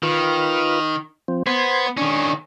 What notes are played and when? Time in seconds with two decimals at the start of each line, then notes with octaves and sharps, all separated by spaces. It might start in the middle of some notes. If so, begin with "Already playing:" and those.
0.03 D#3 F4 B4 F6
1.28 F3 C4
1.47 B3 C5 C6 G#6
1.97 D#3 C#4 D4